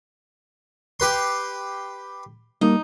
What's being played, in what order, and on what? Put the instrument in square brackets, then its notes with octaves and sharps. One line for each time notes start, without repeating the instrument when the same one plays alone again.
[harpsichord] G4 B4 C6
[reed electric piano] G3 A#3 [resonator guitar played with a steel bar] D#4